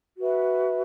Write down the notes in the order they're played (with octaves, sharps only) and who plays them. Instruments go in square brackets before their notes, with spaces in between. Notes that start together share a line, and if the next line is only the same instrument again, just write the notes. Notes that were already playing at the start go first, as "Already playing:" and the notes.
[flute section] F#4 B4 E5